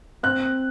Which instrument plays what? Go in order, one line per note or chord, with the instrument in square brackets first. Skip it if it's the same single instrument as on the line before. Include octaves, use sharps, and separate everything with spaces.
[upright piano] C4 F#6